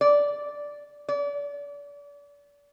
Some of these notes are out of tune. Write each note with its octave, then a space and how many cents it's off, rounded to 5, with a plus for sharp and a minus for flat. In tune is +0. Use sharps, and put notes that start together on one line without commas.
D5 -5
D5 -35